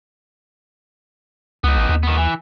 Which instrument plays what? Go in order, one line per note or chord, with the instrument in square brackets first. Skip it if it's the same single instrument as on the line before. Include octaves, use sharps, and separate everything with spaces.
[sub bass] C#2 [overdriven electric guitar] B3 D#4
[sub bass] A1
D#2
[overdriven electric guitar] D#3 B3
E3